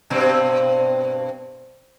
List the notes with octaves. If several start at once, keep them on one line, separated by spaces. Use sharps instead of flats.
G2 B2 C4